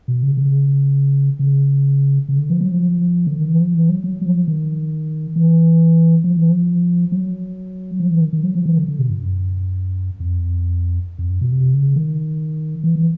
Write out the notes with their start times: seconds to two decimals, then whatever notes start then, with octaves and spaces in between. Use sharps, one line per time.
0.08 B2
0.23 C#3
0.37 C#3
1.39 C#3
2.28 C#3
2.38 D3
2.50 F3
2.61 F#3
2.72 F3
3.27 D3
3.38 D#3
3.49 E3
3.60 F3
3.74 E3
3.89 F#3
4.04 F#3
4.21 F#3
4.26 F3
4.48 D#3
5.36 E3
6.24 F3
6.37 E3
6.49 F3
7.12 F#3
8.00 F3
8.11 E3
8.21 D#3
8.33 D#3
8.43 F#3
8.55 F3
8.66 E3
8.77 D3
8.88 D3
8.99 B2
9.10 G2
9.21 F#2
10.20 F2
11.19 F2
11.30 F#2
11.41 B2
11.52 C3
11.74 C#3
11.96 D#3
12.84 E3
12.95 E3